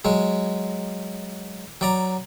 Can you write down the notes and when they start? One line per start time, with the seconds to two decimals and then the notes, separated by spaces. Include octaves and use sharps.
0.05 F#3 G#3
1.81 F#3 D5 A#5